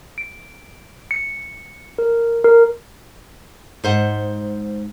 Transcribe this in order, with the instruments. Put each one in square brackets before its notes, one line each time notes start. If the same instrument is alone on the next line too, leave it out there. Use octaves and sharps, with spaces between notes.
[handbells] D7
C#7
A#4
A#4
[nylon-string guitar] G#2 C5 F#5